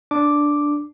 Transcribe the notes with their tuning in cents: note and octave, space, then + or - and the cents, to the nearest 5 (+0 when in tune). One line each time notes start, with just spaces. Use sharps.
D4 +0 D6 +0